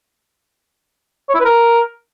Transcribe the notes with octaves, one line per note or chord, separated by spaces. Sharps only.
C#5
E4
B4
A#4